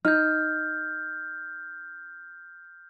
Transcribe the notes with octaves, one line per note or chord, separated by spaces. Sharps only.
D#4 F6 G6